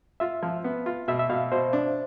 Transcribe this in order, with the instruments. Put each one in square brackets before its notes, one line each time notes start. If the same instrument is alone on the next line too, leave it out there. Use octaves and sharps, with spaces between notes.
[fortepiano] F4 [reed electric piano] E5
[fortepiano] F3
B3
F4
[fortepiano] B2 [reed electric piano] E5
[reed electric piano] E5
[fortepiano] B2 [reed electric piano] F5
[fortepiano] B2 [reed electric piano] C5
[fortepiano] D4